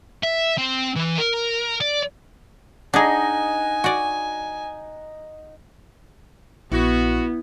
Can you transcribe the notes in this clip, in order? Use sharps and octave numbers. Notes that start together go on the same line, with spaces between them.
E5
C4
E3
A#4
D5
D4 D#4 G#4 D#5 F#5 G#5
F#4 D5
A#1 B3 E4 F#4